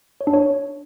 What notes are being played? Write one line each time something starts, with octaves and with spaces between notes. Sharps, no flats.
C#5
D4
C#5